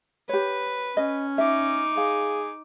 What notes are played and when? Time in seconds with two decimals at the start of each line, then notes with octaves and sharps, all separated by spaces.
0.29 G4 B4 C#5
0.97 C#4 D#5
1.38 D#4 E5 D6
1.97 G#4 F5